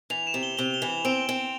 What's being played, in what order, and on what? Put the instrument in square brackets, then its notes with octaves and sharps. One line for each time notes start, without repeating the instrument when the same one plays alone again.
[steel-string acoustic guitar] E3 [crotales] F7
[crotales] E7
[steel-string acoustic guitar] C3
[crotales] G7
[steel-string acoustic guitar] C3 [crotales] G7
[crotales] G7
[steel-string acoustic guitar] E3
[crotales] F7
[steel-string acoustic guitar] C4 [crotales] D7
[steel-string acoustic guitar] C4